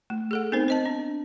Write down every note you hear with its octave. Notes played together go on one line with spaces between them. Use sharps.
A3
G#4 A4 F#5
B3 C4 D#4 A#4 C5
C5 D#5 A5
D4